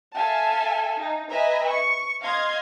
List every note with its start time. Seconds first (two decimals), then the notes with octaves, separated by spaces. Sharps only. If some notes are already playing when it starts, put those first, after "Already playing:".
0.15 A4 E5 F5 G#5 A5
1.00 D#4
1.30 B4 D#5 E5 G#5 A#5
1.69 C#6
2.22 D#5 F5 C6 G#6